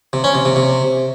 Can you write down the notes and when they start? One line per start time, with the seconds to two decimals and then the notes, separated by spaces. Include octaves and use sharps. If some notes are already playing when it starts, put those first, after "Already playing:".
0.13 C3
0.24 C#4
0.35 C3
0.45 C3
0.56 C3